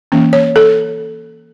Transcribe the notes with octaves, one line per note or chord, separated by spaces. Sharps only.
E3 A#3 C#4
C#5
A4